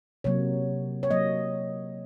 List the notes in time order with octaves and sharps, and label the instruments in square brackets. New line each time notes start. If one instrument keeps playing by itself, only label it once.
[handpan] C3 F#3 A#3 C#5
C#5
F#3 A#3 D#5